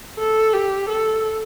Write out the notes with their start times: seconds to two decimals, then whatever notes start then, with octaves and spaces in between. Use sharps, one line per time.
0.19 A4
0.54 G4
0.89 A4